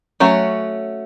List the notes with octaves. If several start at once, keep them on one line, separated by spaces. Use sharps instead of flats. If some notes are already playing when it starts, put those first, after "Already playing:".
F#3 A3 C#4 F#4